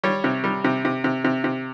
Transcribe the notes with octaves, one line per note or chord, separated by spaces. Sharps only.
G3 C#5
C3
G3
C3
C3
C3
C3
C3